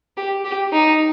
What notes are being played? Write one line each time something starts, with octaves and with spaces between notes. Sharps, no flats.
G4
G4
D#4